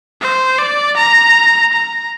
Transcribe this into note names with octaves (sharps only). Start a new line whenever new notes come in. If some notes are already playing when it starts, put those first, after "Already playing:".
C5
D5
A#5
A#5